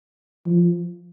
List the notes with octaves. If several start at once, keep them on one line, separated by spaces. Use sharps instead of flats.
F3